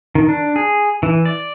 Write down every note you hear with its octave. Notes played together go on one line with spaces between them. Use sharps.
D#3
D4
G#4
E3
D5